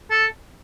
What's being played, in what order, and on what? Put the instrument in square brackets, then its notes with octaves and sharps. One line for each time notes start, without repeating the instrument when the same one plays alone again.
[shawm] A4